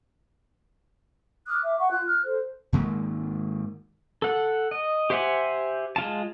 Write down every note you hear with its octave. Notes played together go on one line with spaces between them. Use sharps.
D6 D#6 F6 F#6
E5 D6
F#5 C#6
F4 F#6
F6 F#6
A4 C5
G#2 D#3 G#3 A#3
A4 F#5
D#5
G4 C5 E5 F#5 G#5
G#3 F4 A5